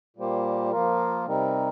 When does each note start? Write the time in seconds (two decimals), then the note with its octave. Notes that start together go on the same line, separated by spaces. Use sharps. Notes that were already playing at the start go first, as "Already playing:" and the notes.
0.16 A#2 G3 A#3 G4 C5
0.71 F3 A#3 F4 A#4
1.26 C3 G3 C4 D#4 A#4